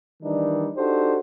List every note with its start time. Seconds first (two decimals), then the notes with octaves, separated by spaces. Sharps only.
0.22 D#3 E3 G3 D4 D#4
0.76 D4 D#4 F#4 G4 A4 C5